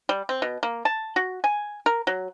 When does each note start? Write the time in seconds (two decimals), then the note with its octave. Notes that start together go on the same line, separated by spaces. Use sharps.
0.09 G3
0.29 C4
0.42 B2
0.63 A#3
0.85 A5
1.16 F#4
1.44 G#5
1.86 A#4
2.07 F#3